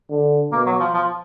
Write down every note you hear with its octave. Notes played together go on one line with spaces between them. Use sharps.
D3
B2 A#3
F#3
F3
F3